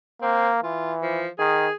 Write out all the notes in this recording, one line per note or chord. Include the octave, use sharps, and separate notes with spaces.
A#3 C4
E3 F4
F3
D#3 G#4